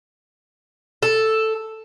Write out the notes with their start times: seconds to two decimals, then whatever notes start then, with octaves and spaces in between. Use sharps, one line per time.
1.02 A4